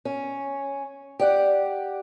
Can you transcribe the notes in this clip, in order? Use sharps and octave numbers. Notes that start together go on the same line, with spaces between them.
C#4
G4 D5 F#5